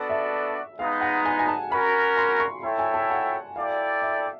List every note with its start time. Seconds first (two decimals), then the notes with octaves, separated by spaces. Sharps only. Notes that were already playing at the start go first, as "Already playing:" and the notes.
Already playing: B3 D4 F#4 A4 D5
0.10 E5
0.79 G#3 B3 D#4 F5
1.01 F#5
1.25 G#5
1.39 G#5
1.48 A5
1.71 C#4 F#4 A#4 B5
2.17 C6
2.40 C#6
2.63 E4 A4 C#5 E5 G5 C6
2.79 G#5
2.94 A5
3.10 F#5
3.55 E4 A4 D5 F5 G5
4.02 E5